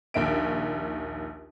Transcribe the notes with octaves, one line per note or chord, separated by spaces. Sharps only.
A#1 D#2 E5 D7